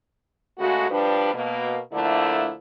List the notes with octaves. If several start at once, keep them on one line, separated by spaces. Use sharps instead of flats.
C#3 G#3 A3 F#4
F3 G3 D4 B4
B2 A#3
D3 F3 A3 A#3 D4 E4